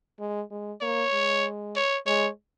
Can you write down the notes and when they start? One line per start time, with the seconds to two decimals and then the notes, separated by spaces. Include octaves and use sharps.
0.20 G#3
0.51 G#3
0.81 A#3 C#5
1.13 G#3
1.76 C#5
2.06 G#3 C#5